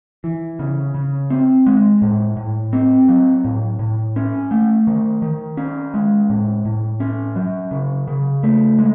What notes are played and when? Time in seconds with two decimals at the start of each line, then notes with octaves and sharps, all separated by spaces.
0.24 E3
0.59 C#3
0.95 C#3
1.30 C4
1.66 G#3
2.02 A2
2.37 A2
2.73 C4
3.09 F#3
3.45 A2
3.79 A2
4.16 C#4
4.51 A3
4.87 D#3
5.22 D#3
5.57 C#4
5.94 G#3
6.30 A2
6.65 A2
7.00 C#4
7.36 F#3
7.71 C#3
8.08 C#3
8.43 A3
8.79 G#3